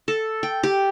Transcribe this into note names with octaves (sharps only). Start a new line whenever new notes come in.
A4
G5
G4